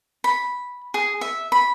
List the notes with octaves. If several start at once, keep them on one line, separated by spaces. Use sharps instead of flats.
B5
G#4
E5
B5